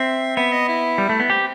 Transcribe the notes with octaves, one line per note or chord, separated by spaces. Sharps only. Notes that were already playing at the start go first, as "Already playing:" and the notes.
Already playing: C4 E5
B3 E5
D#5
E4
G3
A3
B3
C4 G4